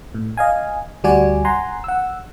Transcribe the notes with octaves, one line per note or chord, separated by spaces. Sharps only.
A2
D#5 F5 G#5
D2 G3 F#4 D5 G#5
F#5 G#5 A#5 C6
F#5 E6